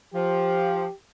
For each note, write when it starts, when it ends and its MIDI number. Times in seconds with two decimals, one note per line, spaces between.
0.14 0.86 53
0.14 0.94 67